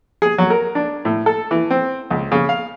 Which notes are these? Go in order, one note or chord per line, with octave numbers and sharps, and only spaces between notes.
G#4
F#3
A#4
D4
A2
A4
E3
C4
C#2
C#3
F5